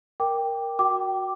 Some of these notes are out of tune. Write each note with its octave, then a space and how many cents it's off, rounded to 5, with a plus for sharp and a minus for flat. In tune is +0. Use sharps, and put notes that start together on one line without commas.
A#4 +0 G5 +10 D6 +0
F#4 +0 G5 -25 D6 +0